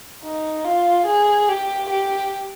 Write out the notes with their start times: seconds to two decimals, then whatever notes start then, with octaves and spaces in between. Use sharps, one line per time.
0.23 D#4
0.65 F4
1.06 G#4
1.48 G4
1.90 G4